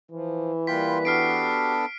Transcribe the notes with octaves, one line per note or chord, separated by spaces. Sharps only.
E3 F3
G3 A#3 F4 B4 G5 C6 B6
B3 D4 F#4 G4 A4 F6 C7 D7